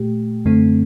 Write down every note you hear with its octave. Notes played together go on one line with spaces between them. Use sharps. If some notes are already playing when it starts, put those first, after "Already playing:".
Already playing: A#2 A3 G4
F#2 D3 A3 C4